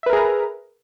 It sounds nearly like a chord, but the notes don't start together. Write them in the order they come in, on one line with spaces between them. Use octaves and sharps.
E5 B4 A#4 G#4 A#5